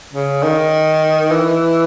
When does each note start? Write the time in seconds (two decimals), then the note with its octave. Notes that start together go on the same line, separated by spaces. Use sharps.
0.13 C#3
0.43 D#3
1.31 E3